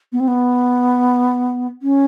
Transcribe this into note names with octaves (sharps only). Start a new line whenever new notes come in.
B3
C4
B3
C#4